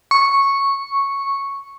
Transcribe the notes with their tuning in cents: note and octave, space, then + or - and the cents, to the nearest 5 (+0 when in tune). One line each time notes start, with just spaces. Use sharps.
C#6 -5